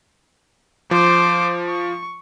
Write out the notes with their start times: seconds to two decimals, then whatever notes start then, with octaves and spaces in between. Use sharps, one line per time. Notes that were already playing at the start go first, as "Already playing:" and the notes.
0.91 F3 C5 D6
1.67 C#6